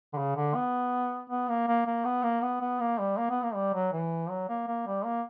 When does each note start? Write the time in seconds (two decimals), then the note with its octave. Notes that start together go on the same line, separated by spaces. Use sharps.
0.13 D3
0.18 C#3
0.36 D3
0.55 B3
1.30 B3
1.49 A#3
1.68 A#3
1.87 A#3
2.05 B3
2.23 A#3
2.43 B3
2.61 B3
2.80 A#3
2.99 G3
3.18 A#3
3.30 B3
3.43 A#3
3.55 G3
3.74 F#3
3.93 E3
4.30 F#3
4.49 A#3
4.68 A#3
4.87 G3
5.05 A#3